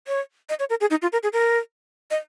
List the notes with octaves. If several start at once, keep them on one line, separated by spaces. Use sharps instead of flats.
C#5
D#5
C#5
A#4
G#4
D#4
F4
A#4
G#4
A#4
D#5